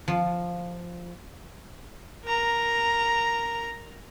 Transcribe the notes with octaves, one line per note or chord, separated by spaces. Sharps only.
F3
A#4 A#5